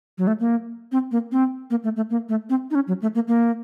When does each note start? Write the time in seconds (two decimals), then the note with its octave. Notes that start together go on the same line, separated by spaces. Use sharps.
0.18 F#3
0.27 A3
0.40 A#3
0.92 C4
1.12 A#3
1.32 C4
1.70 A#3
1.84 A3
1.96 A3
2.11 A#3
2.29 A3
2.50 C4
2.71 D#4
2.75 C#4
2.88 F#3
3.02 A3
3.15 A#3
3.28 A#3